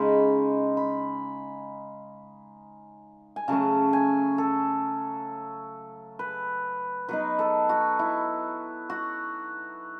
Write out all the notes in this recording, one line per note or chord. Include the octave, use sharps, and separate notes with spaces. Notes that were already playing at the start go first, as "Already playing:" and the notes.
Already playing: C#3 G#3 D#4 B5
B5
G#5
C#3 F#3 A3 C#4 A5
G#5
A4
B4
F#3 B3 D#4 B4
A4
F#4
E4
F#4